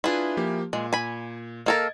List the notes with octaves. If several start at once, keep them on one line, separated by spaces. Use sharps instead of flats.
D4 E4 F4 G#4 B4
F3 A#3 G4
A#2 G#3
G#5 B5
A#3 A4 A#4 D#5 G#6